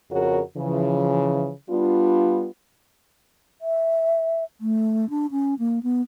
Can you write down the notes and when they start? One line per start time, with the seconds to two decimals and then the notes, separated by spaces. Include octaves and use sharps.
0.10 F2 C#3 F#4 G#4 A#4 C#5
0.57 C#3 E3 F3
1.70 G3 B3 D4 F4
3.61 E5
4.61 A3
5.10 D4
5.31 C#4
5.59 A#3
5.83 B3